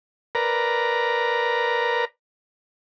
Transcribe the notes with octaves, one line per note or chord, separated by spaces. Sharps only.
A#4 B4 D5 A#5